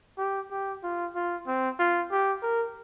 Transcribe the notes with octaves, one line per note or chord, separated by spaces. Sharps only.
G4
G4
F4
F4
C4
F4
G4
A#4